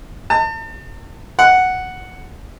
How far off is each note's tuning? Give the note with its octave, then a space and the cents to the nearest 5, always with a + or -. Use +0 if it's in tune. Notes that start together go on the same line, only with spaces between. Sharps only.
A5 +40
F#5 +0